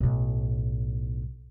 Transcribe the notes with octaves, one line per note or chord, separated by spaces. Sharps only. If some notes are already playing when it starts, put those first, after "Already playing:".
B1 A2